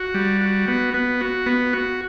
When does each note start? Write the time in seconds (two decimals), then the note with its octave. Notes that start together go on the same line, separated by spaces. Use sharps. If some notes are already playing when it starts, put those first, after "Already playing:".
Already playing: F#4
0.14 G3
0.41 F#4
0.68 B3
0.94 B3
1.21 F#4
1.46 B3
1.73 F#4